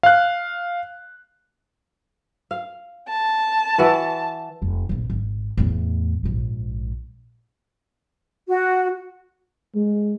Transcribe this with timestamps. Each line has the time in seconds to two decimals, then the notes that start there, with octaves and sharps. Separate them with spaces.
0.03 F5 F#6
2.51 F5
3.08 A5
3.78 E3 F#4 B4
4.62 F1
4.89 A#1 C3
5.10 G#1
5.57 E2 A2
6.23 A#1 G#2
8.48 F#4
9.75 G#3